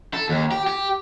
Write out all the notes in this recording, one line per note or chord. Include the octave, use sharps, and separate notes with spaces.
A4
D#2
G4
G4